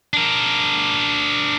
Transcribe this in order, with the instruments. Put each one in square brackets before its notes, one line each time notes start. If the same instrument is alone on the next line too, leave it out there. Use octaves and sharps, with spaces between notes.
[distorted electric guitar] D4 A#4